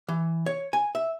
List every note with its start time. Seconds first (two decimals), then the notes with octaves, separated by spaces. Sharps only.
0.08 E3
0.46 C#5
0.73 G#5
0.95 E5